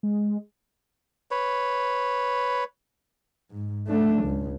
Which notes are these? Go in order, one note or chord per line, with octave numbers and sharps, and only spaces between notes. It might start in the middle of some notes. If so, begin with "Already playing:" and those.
G#3
B4 C#5
G#2
A3 D4
C#2